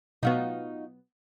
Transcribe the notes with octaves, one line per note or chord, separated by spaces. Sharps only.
B2 F#3 B3 D#4 F4 F#4